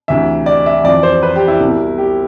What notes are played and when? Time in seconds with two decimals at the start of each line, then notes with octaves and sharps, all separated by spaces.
0.08 D2 C3 E3 E5
0.46 D5
0.66 E5
0.84 F2 E3 D5
1.03 C5
1.23 B4
1.36 G4
1.48 E4
1.60 C2 B2
1.98 G4